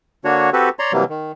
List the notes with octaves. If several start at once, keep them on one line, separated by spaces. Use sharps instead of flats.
D3 A#3 D4 F#4 C#5
C4 F#4 G4 A4 B4
C#5 D5 A#5 C6
C3 E3 F#3 G3 A#3
D#3